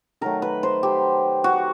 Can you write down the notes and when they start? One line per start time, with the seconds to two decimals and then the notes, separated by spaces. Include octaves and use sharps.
0.21 D#3 F#3 A3 A#4
0.42 B4
0.63 C5
0.83 G4
1.44 F#4